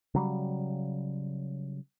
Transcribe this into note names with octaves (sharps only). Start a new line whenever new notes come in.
C#3 F#3 G3